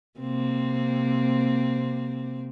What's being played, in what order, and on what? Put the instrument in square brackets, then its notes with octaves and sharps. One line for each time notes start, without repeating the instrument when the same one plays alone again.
[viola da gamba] C3 A#3 C4